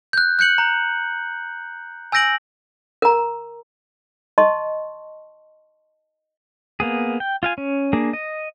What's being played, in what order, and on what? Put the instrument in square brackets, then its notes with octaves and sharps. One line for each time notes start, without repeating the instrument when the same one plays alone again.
[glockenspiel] F#6 G6
F#6 G6 C#7 F#7
A#5
G#5 E6 G6 A#6 D7 F#7
[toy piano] A#4 A#5
D#5 A5 C6 C#6
[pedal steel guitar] A#3 B3 G#4
G5
F4 F5 G#5
C#4
A#3 D4 G#4
D#5